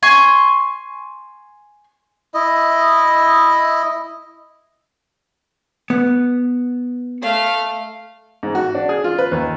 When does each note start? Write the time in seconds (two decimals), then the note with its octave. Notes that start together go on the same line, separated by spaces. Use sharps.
0.03 G#5 C6 C#6
2.34 E4 D#5
5.90 B3
7.22 A3 F5
8.43 G#2
8.55 F#4
8.75 D4
8.89 G#4
9.04 F4
9.18 B4
9.32 D#2